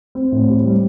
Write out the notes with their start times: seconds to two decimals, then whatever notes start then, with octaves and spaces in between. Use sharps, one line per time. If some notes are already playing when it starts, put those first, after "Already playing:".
0.15 C4
0.32 A2
0.49 G4
0.64 G3